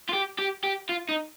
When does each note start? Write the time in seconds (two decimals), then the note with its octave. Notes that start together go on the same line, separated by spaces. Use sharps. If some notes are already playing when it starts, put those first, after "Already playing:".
0.09 F4
0.14 G4
0.39 G4
0.64 G4
0.89 F4
1.09 D#4